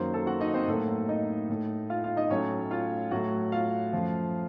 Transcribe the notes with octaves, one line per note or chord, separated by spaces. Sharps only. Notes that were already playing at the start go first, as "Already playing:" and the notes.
Already playing: F#2 D#3 F#3 A#3 C5 C6
A4 A5
F#4 F#5
D#4 D#5
C4 C5
A2 F#3 A#3 A4
D#4 D#5
A2 A3
F4 F5
F4 F5
D#4 D#5
A2 F#3 A3 C#4 C#5
F4 F5
A2 F#3 A3 F#4 F#5
F4 F5
F#2 F3 A3